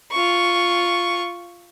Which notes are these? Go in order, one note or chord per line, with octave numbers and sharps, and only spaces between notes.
F4 C#6